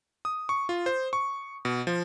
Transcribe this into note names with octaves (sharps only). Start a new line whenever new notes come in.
D#6
C#6
F4
C5
C#6
B2
F3